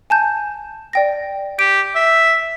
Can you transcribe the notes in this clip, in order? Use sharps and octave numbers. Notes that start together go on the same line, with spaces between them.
G#5 A5 G6
D5 G5 A#6
G4 D7
E5